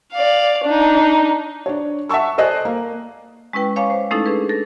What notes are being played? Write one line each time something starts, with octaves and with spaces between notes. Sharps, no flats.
D5 F5
D4 D#4
D4 C#5
E5 F#5 A5 C#6 E6
A4 C5 D5 D#5 G#5 F#6
A#3
G#3 C#4 E4 B4 G5
C#5 F5 G#5 A#5 C#6 D6
C5
G#3 A3 C#4 D#4 E4 A4
D4 G#4 B4
A4 A#6